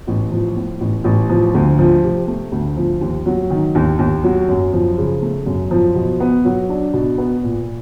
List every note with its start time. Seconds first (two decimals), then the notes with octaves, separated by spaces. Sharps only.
0.07 A1
0.32 F3
0.56 A2
0.80 A1
1.04 A1
1.30 F3
1.54 D2
1.79 F3
2.04 C3
2.27 A3
2.52 D2
2.77 F3
3.01 D#2
3.26 F#3
3.50 D#3
3.75 D#2
3.99 D#2
4.24 F#3
4.49 F#2
4.73 F3
4.98 C#3
5.22 A3
5.46 F#2
5.71 F3
5.95 B2
6.20 B3
6.45 F#3
6.69 D4
6.93 B2
7.18 B3
7.43 A#2